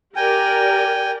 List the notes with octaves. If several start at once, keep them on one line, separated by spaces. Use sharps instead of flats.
G4 A#4 D5 G5 G#5